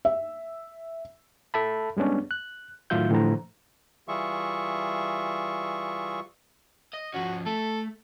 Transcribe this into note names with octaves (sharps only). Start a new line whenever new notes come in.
E5
A4 E5 A5 B5
G3 G#3 B3 C#4 D4
F#6
A2 D#3 F#3 F4 E5 G6
A2 D3 E3 F3 C5 A#5
E3 G3 F4 G#4 E5 C#6
D#5
F3 C#4 F#4
A3 A4